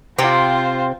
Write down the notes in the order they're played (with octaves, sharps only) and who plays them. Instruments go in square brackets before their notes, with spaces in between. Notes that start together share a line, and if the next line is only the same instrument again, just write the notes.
[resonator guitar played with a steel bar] C3 C4 [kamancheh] F4 C5